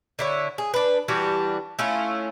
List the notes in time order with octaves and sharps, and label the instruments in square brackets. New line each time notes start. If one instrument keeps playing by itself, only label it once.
[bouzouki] D3 E4 C#5
G#4
D4 B4
E3 G3 D4 F#4
A3 C#4 E4 F4